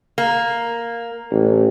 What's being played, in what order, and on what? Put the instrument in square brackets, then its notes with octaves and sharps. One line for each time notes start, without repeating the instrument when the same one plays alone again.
[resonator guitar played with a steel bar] A#3
[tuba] A1